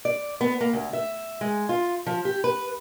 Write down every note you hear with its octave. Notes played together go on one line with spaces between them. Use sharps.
D5
B3
A#3
D2
E5
G#3
F4
F3
G4
B4